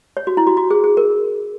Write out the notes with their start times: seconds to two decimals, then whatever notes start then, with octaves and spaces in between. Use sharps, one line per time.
0.17 C#5
0.27 F#4
0.37 E4
0.47 F#4
0.57 F#4
0.71 G#4
0.84 G#4
0.97 A#4